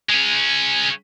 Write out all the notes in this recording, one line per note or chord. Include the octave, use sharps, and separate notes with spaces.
G#3 C#4